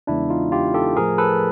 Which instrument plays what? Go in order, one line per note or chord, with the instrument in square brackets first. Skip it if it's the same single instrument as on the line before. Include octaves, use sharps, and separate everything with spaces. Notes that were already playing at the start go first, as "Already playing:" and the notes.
[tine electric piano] E2 C#3 E3 G#3 B3 D4 E4
D#4 F4
F4 G4
G4 A4
A2 F3 A3 G#4 A#4
A4 B4